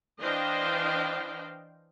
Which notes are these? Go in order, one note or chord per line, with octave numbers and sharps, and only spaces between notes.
E3 D4 C5 D#5 F5 G5